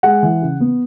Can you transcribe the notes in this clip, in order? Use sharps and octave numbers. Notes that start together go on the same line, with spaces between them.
G#3 F#5
E3
C#3
B3